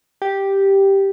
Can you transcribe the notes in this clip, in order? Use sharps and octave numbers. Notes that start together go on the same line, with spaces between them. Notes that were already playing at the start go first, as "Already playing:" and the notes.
G4